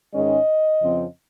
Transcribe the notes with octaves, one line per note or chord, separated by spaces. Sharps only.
G#2 D#3 G#3 C#4 D#5
F2 C#3 F3 C4